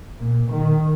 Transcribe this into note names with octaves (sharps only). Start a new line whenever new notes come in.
A#2
D#3